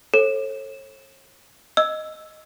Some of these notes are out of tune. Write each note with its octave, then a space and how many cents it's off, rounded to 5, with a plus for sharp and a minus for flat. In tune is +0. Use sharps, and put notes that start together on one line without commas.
A4 +0 C#5 -40
D#5 +0 E6 +0